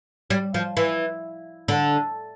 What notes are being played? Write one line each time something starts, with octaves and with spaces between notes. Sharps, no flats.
G3
F3
E3
D3